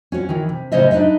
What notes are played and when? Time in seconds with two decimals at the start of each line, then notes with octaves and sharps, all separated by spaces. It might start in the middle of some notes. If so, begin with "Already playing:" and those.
0.12 C#4 F#4 C#5
0.29 D#3 E3
0.49 C3
0.72 A2 C#3 C#4 C5 D#5 E5
0.91 D4 D#4 B4 D#5 E5